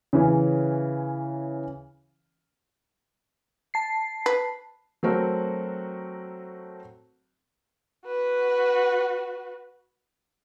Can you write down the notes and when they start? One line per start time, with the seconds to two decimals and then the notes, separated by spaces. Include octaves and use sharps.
0.13 C#3 E3 C#4
3.74 A5 C7
4.26 B4
5.03 F#3 A3 C4 F#4 A#4
8.06 F#4 B4